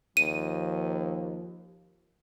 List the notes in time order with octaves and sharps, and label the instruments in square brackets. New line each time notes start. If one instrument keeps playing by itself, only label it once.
[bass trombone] D#2 [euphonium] F3 [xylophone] D#7